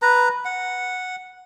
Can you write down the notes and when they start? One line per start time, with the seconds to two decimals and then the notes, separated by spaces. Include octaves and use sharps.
0.02 B4 A#5
0.45 F#5